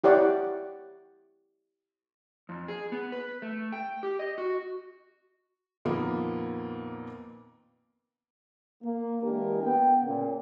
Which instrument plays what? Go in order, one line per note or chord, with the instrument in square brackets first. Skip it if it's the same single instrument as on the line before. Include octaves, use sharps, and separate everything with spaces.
[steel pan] E4 G4 C#5 D5 F#5
[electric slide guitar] F2
G#4
B3
B4
A3
G5
G4
D#5
F#4
[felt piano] F2 A#2 D#3 F3 A#3 B3
[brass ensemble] A#3
E3 G#3 A#3 D4 G4 A#4
B3 G5
A#2 C#3